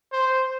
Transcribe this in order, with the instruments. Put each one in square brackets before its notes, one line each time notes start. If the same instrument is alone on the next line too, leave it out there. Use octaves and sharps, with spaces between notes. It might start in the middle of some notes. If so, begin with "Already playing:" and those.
[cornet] C5